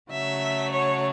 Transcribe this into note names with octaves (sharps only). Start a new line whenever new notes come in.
C#3 F#3 A3 E5
C#5